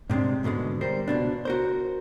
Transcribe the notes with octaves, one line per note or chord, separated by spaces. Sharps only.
G#2 C3 G#3 D4
D#2 G#2 B2 D3 G#3
G3 A#4 C5
C#2 B2 D4
F#4 A#4 C5